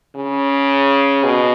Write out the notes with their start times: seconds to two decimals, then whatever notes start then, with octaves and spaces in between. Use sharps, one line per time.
0.15 C#3
1.24 B2